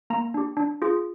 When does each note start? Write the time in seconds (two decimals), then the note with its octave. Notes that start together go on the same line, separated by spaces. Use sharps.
0.10 A#3 A#5
0.34 D4 G4
0.57 D4
0.82 F4 G#4